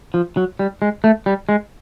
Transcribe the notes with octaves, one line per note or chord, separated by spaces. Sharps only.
F3
F#3
G3
G#3
A3
G3
G#3